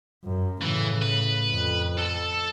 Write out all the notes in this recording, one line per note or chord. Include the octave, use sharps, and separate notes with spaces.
F#2
A2 C#3 E3
B4
F2
A4 A5